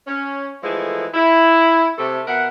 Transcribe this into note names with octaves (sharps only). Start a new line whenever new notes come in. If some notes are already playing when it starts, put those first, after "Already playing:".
C#4
E3 F3 G#3 A3 G#4 A4
E4
C3 A3 A4
B2 A#4 E5 F#5